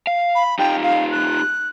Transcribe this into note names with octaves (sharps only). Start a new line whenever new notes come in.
F5
B5
D#4 F4 G4 G5
F5
F#6